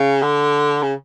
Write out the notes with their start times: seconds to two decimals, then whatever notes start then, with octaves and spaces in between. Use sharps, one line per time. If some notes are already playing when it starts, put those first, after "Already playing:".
Already playing: C#3
0.22 D3
0.83 C#3